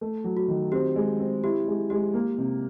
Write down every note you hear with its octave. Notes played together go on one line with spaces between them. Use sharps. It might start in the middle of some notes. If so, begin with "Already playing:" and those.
A3
F#3
F#4
D#3
C4 G4
G#3
C4
E4 G4
G#3
G#3 G4
A#3
C3